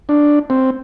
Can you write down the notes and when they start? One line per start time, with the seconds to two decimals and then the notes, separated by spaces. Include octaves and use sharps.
0.09 D4
0.50 C4